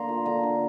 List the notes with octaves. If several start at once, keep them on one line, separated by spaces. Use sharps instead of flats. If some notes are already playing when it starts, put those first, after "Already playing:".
Already playing: D3 A#3 A#5 C6
F4
D3 A#5
D3